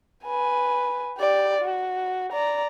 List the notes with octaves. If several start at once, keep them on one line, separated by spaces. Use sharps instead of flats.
B4 G#5
G4 D5
F#4
D5 A#5